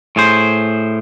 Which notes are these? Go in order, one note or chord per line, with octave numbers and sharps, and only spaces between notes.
A2 G#4 C5